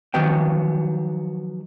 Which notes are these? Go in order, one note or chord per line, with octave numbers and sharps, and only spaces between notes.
D#3 F3 F#3 B3 G5